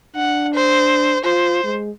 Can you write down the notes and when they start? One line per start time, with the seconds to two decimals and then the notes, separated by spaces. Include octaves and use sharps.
0.16 D4 F#5
0.54 C5
1.25 F4 C5
1.64 G#3